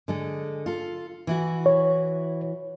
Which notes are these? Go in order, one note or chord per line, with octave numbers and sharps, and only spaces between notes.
D3 G#3 A4
F4 A4
E3 E4 F#4
C#5